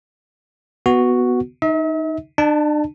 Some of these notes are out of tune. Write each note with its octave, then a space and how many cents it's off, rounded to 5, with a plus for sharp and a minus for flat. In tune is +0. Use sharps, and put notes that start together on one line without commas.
B3 +0 F#4 +0
D#4 +0 E5 -45
D4 +40 A5 +0